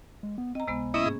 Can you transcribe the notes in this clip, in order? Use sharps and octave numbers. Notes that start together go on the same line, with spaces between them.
G#3
B3
C4 D#5 A#5
C#2 C3 G#3 B3
A#3 C#4 E4 D#5
G#2 G#4